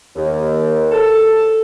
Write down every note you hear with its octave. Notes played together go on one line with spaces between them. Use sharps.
D#2
A4